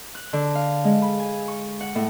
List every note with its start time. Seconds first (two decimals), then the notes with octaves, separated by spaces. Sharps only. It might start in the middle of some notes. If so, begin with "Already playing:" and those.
0.15 F#6
0.33 D3
0.55 F5
0.84 G#3
1.02 B5
1.19 G#5
1.48 C#6
1.81 F#5
1.95 A2